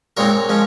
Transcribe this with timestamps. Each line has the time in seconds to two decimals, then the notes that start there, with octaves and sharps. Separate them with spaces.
0.17 A#2 G#3 C4 D#4 A#4 C#5
0.49 F3 G#3 C#4